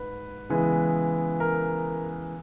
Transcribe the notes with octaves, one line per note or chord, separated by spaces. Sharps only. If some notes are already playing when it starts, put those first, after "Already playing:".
Already playing: G#2 B4
C#3 E3 G#3 B3
A#4